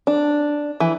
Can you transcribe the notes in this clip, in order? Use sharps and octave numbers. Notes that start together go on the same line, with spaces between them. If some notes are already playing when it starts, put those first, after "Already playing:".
D4
E3